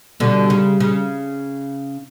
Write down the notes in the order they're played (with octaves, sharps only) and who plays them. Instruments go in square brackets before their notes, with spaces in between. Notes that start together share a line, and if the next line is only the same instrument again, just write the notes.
[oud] B2 D3 [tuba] G3
[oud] C#3
C#3